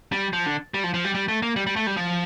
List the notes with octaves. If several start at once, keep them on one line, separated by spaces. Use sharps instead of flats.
G3
F3
D3
G3
F3
F3
G3
G3
A3
A#3
G3
G3
A3
G3
F3